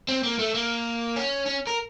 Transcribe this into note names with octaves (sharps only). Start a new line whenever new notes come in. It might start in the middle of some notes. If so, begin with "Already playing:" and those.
C4
A#3
A3
A#3
C#4
C#4
A#4